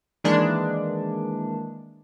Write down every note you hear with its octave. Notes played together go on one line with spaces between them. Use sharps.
D#3 E3 G#3 A#3 D4